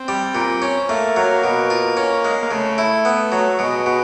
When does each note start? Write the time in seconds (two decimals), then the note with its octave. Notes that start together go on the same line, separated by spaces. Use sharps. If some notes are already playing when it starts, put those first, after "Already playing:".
Already playing: C4
0.08 G3
0.35 A#2
0.62 C#4
0.89 A3 A#3
1.17 F#3
1.44 B2
1.70 F4
1.97 C#4
2.25 G#3
2.43 A#3
2.51 C#3 A3
2.78 E4
3.05 B3
3.32 F#3
3.59 B2 G#3
3.86 B2